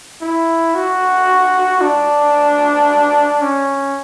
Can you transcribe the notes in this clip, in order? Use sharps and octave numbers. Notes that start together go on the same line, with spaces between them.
E4
F#4
D4
C#4